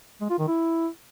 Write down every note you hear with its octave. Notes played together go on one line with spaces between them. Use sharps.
G#3
F4
D#3
E4